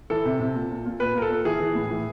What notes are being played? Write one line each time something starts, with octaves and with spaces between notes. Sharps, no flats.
E3 A4
C3
C3
A#2
A#2
A#2
A#2 B4
A#2 A#4
A4
A#2
E3 G#4
E3
A2
E3